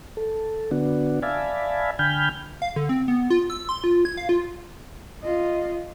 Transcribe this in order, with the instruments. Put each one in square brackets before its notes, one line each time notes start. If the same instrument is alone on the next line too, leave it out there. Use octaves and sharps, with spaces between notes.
[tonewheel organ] A4
D3 B3 D4 F#4
D5 E5 F5 G#5 A5 B5
D3 G5 G#5 B5 F6 G6
[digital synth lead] F5
D3
C4
B3
F4
E6
C6
F4
G#6
F5
F4
[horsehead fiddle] F4 D#5